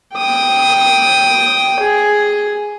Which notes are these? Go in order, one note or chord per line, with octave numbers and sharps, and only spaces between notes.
G5 D#6
G#4